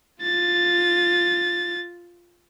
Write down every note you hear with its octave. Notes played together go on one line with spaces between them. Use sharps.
F4 A6